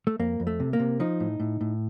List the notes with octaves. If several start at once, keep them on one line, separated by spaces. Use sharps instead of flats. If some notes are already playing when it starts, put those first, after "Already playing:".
A3
F2 A#3
F2
A3
C3
A#3
C3
F3 D#4
A2
A2
A2